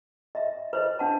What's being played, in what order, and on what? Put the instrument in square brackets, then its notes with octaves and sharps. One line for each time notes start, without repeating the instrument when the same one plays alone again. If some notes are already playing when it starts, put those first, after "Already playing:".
[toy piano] D#5 E5
B4 C5 D#5
D4 F#5 A5